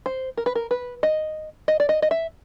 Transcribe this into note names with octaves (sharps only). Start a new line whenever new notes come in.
C5
A#4
B4
A#4
B4
D#5
D#5
D5
D#5
D#5
E5